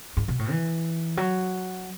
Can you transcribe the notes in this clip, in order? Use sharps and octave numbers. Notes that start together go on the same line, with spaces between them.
G#2
B2
A2
E3
F#3